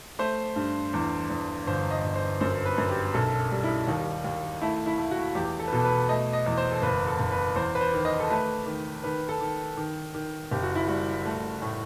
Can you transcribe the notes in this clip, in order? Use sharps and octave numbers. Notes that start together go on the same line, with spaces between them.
A3 C5
G2
E2
E2
G1 C5
D#5
G1
C5
F#2 C5
B4
F#2
G4
B1 A4
G3
E4
D#2 D#4
D#2
A3 E4
E4
A3
F#4
E2 G4
A4
B4
B2 A4
B4
A3 D#5
D#5
E2
C5
A4
F#1 B4
A4
F#1
B4
E2 C5
B4
C5
D#3
D#5
A4
A3 B4
D#3
D#3 B4
A4
D#3
D#3
D#3
F#1 G4
F#4
E4
G3 F#4
A3
A2